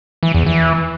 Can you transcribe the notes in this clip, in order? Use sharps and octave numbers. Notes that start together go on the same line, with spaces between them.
E3
E2
E3